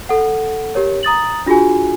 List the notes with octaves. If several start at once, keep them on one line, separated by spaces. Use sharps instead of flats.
A4 F#5
G4 A#4 C#5
A#5 D#6 A6 F#7
D4 F4 F#4 G#4 G#5